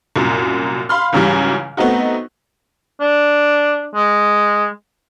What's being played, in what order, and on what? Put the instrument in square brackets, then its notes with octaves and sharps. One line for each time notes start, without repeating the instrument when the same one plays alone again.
[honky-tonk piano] C2 F#2 A#2
F5 B5 C6 F6
C#2 G#2 C#3 E3 F#3 G3
A3 B3 C4 D#4 F#4
[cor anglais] D4
G#3